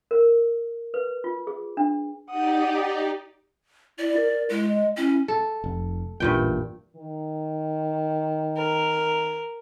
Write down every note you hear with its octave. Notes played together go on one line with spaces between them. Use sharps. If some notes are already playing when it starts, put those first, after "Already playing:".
A#4
B4
F4
G#4
D4
D#4 G4 D5 F#5 D#6
E4 D5
A#4
A#4
G#3 E4
D#5
C#4 E4
A4
F1
A1 E2 G2 A#2 E3 G5
D#3
A#4